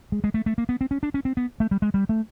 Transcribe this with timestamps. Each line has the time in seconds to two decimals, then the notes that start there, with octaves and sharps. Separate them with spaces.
0.12 G#3
0.24 G#3
0.34 A3
0.46 A3
0.58 A#3
0.69 B3
0.81 C4
0.91 C#4
1.03 D4
1.14 C#4
1.25 C4
1.37 B3
1.60 A3
1.71 G3
1.82 G#3
1.94 G3
2.09 A3